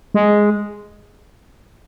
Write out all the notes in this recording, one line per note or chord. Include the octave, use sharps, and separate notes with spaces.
G#3